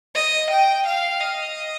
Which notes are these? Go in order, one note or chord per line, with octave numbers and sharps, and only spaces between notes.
D#5
G5
F5
D#5